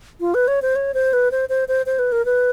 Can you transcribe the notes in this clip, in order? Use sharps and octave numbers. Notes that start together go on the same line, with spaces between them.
F4
B4
C#5
C5
C#5
C5
B4
C5
C5
C5
C5
B4
A#4
B4